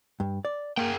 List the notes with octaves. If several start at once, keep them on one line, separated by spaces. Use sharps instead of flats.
G2
D5
A#3 G#4 A#4 G5